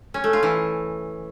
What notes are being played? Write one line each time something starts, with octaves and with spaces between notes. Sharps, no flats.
C#4
A3
F4
E3